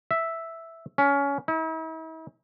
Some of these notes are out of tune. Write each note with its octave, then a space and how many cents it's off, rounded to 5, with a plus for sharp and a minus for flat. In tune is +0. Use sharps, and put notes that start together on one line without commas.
E5 +0
C#4 +20
E4 -45